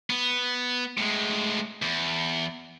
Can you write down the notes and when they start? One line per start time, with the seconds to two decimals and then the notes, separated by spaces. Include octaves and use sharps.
0.10 B3
0.98 A2 G#3
1.82 E2